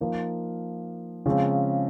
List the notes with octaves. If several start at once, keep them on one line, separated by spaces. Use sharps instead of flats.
F3 A#3 D#4
C#3 F3 G#3 C4